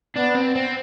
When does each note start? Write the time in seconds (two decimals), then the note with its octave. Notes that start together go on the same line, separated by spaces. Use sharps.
0.16 B3 D4
0.36 C4
0.55 C4